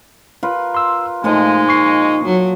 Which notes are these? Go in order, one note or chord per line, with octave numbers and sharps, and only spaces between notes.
F4 A#4 B4
C6 E6
A#2 F3 G#3 A3 D#4 A5
C#6 C7
F#3